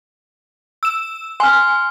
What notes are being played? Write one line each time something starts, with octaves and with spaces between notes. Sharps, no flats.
E6 E7
G#5 C6 F6